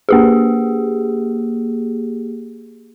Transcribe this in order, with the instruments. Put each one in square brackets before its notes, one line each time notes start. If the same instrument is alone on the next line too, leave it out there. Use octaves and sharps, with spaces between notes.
[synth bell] A#3 G4 G#4